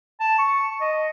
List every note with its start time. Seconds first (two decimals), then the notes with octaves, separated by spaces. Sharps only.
0.20 A5
0.38 C#6
0.81 D#5